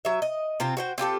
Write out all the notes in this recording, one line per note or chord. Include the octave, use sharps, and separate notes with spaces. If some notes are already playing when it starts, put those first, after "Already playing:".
F#3 E5
D#5
C3 C4 F4
F#4 C5 G5
C4 F4 G4 A4